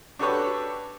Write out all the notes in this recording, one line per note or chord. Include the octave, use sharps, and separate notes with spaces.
D4 F#4 G4 A4 B4 C#5